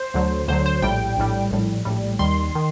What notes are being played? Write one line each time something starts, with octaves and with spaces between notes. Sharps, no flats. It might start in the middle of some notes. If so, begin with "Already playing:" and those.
Already playing: C5
D2 D3 F#3
D2 D3 F#3 C5
C5
A#1 A2 G3 G5
A#1 A2 G3
A#1 A2 G3
A#1 A2 G3
D#2 D#3 G3 C6
D#3